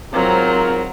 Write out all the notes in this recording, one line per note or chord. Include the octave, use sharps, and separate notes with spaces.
G#2 F#3 C4 F4 A#4 A#5